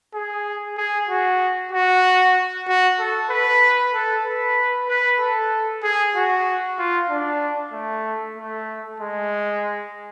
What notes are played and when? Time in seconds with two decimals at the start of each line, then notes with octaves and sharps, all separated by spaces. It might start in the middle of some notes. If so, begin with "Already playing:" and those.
0.15 G#4
0.78 G#4
1.09 F#4
1.72 F#4
2.68 F#4
3.00 A4
3.30 B4
3.94 A4
4.26 B4
4.88 B4
5.20 A4
5.83 G#4
6.16 F#4
6.79 F4
7.10 D4
7.73 A3
8.37 A3
9.00 G#3